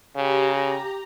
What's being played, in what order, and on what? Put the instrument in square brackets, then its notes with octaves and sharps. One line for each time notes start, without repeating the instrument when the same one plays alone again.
[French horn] C#3 [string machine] G4 A#5